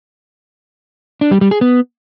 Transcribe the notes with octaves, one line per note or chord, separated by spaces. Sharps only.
D4
G3
G3
G#4
B3